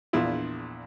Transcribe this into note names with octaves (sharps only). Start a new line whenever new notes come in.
A#1 E2 D4 E4 F4